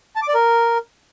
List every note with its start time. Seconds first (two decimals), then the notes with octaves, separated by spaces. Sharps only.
0.16 A5
0.22 D6
0.28 D5
0.34 A#4